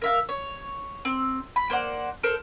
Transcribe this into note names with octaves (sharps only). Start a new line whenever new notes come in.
A#4 E5 F5
C#5
C4
B5
A#3 C5 D5 F#5
A4 A#4 C5